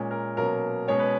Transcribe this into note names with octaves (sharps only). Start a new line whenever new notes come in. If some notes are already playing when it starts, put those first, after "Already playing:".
Already playing: A#2 G#3 C#4
A#4
B2 F#3 A#3 C#4 A#4
B2 G#3 C#4 C#5
B4